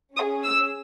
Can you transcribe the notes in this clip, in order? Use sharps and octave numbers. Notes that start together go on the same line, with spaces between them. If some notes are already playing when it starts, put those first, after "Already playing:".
C#4 G#4 D#6
E6